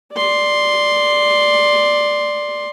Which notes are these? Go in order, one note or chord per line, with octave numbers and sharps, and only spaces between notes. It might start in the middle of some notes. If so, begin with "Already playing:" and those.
D5 C6